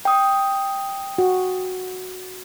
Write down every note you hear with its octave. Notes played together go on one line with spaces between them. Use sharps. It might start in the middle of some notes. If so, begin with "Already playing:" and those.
G5 D#6
F#4